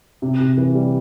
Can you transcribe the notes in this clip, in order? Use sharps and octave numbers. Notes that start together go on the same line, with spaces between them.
C3
C3
E3
G3